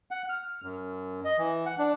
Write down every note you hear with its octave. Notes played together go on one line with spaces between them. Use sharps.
F#5
F6
F#2
D#5
E3
F#5
D4